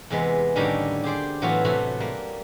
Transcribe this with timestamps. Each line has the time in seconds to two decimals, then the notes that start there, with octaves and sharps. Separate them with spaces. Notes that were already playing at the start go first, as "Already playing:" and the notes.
0.10 E2 C3 G#3 B3
0.55 A2 D3 D#3 G3 A#3 C#4
1.04 G4 G#4 C5 D5
1.42 A2 E3 F#3 B3 F4 F#4
1.65 C3 F#3 A3 F#4 B5
2.00 G3 A#3